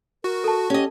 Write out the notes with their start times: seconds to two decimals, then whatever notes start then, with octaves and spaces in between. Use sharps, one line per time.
0.24 F#4 A#4
0.44 A4 A5
0.70 C#4 G4 D#5